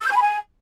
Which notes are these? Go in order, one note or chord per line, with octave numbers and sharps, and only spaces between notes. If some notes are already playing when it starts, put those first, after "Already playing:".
E6
G6
G#5
B5
G#5